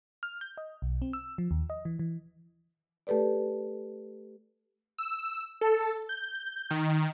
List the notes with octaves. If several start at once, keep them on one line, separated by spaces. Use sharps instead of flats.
F6
G6
D#5
B1
C4
E6
F3
D#2
D#5
E3
E3
A3 G4 A4 B4 D5
E6
A4
G6
D#3